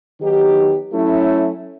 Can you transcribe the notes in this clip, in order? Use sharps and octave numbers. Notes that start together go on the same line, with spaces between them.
D#3 F#3 B3 D#4 G4
F#3 A3 C#4 E4